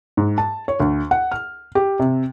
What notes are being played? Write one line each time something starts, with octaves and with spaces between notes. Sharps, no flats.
G#2
A5
C#5
D2
F#5
F6
G4
C3